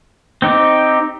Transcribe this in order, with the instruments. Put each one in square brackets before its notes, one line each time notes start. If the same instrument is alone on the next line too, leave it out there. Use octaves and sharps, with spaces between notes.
[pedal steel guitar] C4 D#4 G4